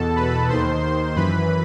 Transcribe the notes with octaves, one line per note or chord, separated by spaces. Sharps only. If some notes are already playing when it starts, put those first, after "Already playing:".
Already playing: E2 B2 A4 A5
B4 B5
D#2 D#3 C5 C6
F#2 E3 B4 B5